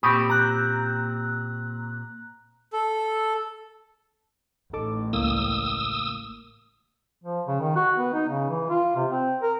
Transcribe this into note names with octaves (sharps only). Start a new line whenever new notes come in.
A#2 C4 G4 B5 C#6 D#6
A#5 F#6
A4
A1 D#4 A4 D6
C#2 A2 A#3 D#6 E6
F3
C#3
D#3
F#4
B3
D#4
C#3
E3
F4
C3
C4
A#4